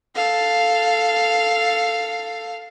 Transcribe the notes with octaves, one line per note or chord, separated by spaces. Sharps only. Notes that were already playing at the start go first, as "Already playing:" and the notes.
A4 F5